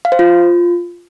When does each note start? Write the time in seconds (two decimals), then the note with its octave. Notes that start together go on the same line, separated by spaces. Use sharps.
0.05 F5
0.12 C5
0.19 F4